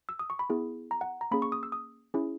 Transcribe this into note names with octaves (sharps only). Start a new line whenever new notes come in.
E6
D#6
C#6
B5
B3 E4 G#4
A#5
F#5
A#5
A#3 C#4 G#4 B5
C#6
D#6
E6
D#6
C#4 E4 G#4